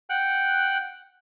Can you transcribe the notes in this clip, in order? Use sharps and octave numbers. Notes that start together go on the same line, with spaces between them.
F#5 G5 F#6